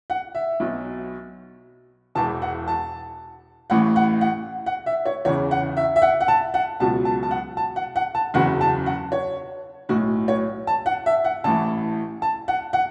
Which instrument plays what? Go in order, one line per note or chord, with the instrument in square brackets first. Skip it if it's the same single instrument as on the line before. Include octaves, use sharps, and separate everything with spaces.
[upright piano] F#5
E5
B1 B2 F#3
E1 E2 E3 A5
F#5
A5
A1 A2 E3 F#5
F#5
F#5
F#5
E5
C#5
E2 C#3 E3 C#5
F#5
E5
E5
F#5
F#5
A5
F#5
C#2 B2 F#3 A5
A5
A5
F#5
A5
F#5
F#5
A5
F#1 E2 C#3 F#3 F#5
A5
F#5
C#5
B1 A2 F#3 F#4
C#5
A5
F#5
E5
F#5
A1 A2 E3 A5
A5
F#5
F#5